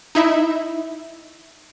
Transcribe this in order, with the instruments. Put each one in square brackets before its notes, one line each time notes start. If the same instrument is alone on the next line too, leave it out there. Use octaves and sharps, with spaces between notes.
[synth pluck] D#4 E4 E5